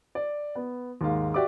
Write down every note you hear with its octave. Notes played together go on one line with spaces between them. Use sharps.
D5
B3
D#2 G#2 F5
F#4 G4 D5 E5 D6